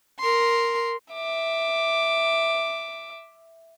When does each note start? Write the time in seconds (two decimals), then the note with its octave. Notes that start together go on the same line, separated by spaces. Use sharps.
0.19 A#4 C6
1.14 E5 D6